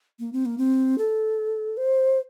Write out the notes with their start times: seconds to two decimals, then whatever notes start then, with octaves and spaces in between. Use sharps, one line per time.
0.19 A#3
0.33 C4
0.46 A#3
0.58 C4
0.98 A4
1.77 C5